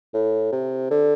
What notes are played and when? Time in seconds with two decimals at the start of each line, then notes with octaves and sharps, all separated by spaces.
0.14 A2
0.52 C3
0.91 D3